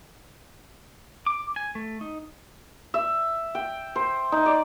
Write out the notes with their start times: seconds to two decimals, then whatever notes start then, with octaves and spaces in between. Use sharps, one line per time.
1.26 D6
1.56 G#5
1.75 A3
2.01 D#4
2.94 E5
3.55 G5
3.96 C5
4.32 D#4
4.46 D5